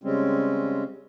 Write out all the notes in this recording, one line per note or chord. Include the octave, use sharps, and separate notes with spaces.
C#3 G3 G#3 C4 C#4